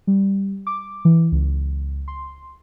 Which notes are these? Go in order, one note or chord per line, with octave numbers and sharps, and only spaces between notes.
G3
D6
E3
C#2
C6